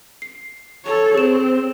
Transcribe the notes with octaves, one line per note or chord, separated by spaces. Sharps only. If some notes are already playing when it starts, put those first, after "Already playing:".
C7
A4 C#5
C4 G#4 E7